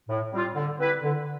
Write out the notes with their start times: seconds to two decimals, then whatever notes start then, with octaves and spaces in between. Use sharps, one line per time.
0.09 A2
0.32 G3 C4 F4
0.55 D3
0.79 G3 C4 E4 B4
1.01 D3